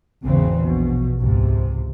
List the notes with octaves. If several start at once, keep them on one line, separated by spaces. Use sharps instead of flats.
G#1 E2 C#3 E3 C4
A#1 B2
C#2 G#2 C3